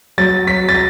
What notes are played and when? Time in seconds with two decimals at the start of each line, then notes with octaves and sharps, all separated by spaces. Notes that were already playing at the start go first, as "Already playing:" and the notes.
0.18 F#3 A6
0.47 F#3 B6
0.69 A6
0.75 A#6